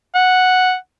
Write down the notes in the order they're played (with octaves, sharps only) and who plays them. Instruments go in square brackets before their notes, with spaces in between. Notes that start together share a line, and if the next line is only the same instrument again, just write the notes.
[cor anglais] F#5